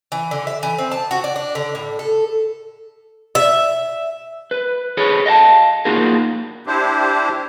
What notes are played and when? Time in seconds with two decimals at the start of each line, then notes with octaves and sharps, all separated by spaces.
0.12 E3
0.31 D3
0.47 E5
0.63 E3
0.78 C4
0.91 A5
1.11 F#4
1.24 D5
1.36 D4
1.55 D3
1.75 A2
1.99 A4
3.35 E5
4.51 B4
4.97 G#4 A4 B4 C#5
5.26 D#5 F5 G5 A5
5.85 A#3 D#4 F4 F#4 G#4 A#4
6.67 D4 E4 G4 C5